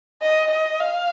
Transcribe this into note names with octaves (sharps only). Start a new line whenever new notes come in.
D#5
D#5
F5